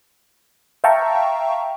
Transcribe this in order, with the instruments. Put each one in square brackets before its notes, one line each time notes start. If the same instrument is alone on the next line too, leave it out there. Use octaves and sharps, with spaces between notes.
[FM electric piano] E5 F5 G5 A5 A#5 C#6